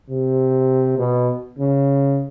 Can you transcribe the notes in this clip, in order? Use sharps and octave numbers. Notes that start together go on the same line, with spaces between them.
C3
B2
C#3